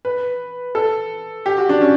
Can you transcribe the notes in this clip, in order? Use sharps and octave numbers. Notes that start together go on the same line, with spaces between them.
B4
A4
G4
F#4
D4
C#4